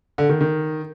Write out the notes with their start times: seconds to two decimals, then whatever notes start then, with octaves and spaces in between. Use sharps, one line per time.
0.18 D3
0.29 D#3
0.41 D#3